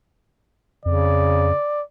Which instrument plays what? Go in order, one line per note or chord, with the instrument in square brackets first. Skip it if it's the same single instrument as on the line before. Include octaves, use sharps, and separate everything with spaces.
[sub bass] F2 [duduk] C#3 [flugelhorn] D5